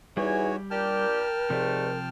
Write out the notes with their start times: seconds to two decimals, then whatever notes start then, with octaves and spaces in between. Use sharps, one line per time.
0.17 E2 G3 D#4 F#4 C#5 G#5
0.71 A#2 D4 G4 A#4 G5 A5 F6
1.50 G#2 C3 F3 G3 A3